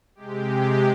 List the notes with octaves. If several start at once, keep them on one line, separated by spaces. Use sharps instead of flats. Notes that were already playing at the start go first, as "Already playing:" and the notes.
C3 G#3 G4